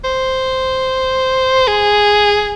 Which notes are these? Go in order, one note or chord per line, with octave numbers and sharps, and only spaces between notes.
C5
G#4